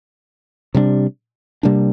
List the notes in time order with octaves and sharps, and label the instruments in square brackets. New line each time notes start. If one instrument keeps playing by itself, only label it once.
[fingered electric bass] C3 G3 A#3 D4
C3 G3 A#3 D4